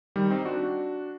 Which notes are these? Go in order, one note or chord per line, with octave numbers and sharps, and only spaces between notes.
D#3 G3
C4 D#4
D4 F#4